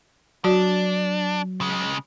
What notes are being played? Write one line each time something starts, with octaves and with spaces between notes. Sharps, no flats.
F#3 D4 F#4 D5
C#3 G#3